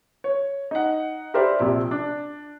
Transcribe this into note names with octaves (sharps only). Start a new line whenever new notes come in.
C#5
D#4 F#5
G4 A#4 C5 D5 E5 B5
A#1 C3
D4